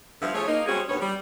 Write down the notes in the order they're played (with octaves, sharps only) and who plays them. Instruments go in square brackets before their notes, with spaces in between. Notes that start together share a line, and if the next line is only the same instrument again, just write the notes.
[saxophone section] G2 D3 F3 B3 E5 F5
F3 A3 G#4 C#5
A#3 D#4
G3 G#3 C4 C#4 F#4 G#4
D#2 D3 B3 C#4 C#5
G3